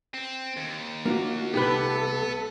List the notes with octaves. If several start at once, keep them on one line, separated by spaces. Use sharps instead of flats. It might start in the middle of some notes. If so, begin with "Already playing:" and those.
C4
D#2
A#3 D4 F4 F#4
C2 G2 A3 B3 D#4 G4 A4 B4